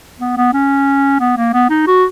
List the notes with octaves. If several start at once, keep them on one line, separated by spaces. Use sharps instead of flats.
B3
B3
C#4
B3
A#3
B3
D#4
F#4